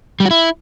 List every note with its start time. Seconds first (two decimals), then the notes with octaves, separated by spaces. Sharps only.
0.20 G3
0.25 F#4
0.31 E4